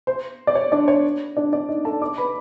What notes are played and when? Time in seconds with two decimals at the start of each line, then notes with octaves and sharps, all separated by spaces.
0.07 C5
0.47 D5
0.55 C#5
0.72 D4 D5
0.88 C#5
1.37 D4 D5
1.52 D4 D5
1.69 D#4 D#5
1.85 A4 A5
2.02 D5 D6
2.18 B4 B5